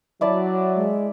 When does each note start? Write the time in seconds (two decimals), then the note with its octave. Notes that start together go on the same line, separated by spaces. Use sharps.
0.21 F#3 E4 D5 A5
0.75 G#3